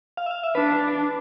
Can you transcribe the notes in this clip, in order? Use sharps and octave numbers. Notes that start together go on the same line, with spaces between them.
F5
E5
F5
E5
D4 B4